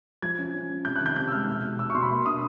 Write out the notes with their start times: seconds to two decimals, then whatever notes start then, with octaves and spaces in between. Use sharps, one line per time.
0.22 F3 G#6
0.38 C#4
0.54 C#4
0.69 C#4
0.85 C3 G6
0.96 F#6
1.01 D#3 G6
1.16 C3 G6
1.28 E6
1.32 G#3 F6
1.48 B2
1.63 B2
1.79 B2 E6
1.90 C#6
1.94 B2 C6
2.02 B5
2.10 A#3 C6
2.26 D4 D#6